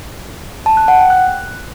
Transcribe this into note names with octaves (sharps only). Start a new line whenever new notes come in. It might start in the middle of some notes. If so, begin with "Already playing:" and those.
A5
F#6
F#5
G5
F#6